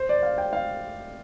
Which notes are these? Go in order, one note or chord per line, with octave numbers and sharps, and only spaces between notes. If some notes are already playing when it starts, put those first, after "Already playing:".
Already playing: C5
D5
F5
G5
F5